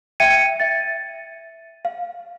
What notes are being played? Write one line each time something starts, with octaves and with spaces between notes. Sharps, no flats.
E5 G5 G#6 C#7 D#7
E5 A6
F5